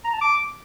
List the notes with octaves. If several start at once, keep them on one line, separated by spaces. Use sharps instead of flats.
A#5
A5
D6